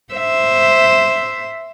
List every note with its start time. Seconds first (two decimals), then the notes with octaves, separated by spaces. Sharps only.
0.13 C5 E5